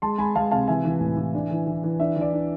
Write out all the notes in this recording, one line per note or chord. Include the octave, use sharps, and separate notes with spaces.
G#3 A5 C6
G#3 G#5 B5
G#3 F5 A5
C3 F5 A5
E3 E5 G#5
E3
A2
E3
D4
E3
E3
E3
D4 E5
E3
D5
D4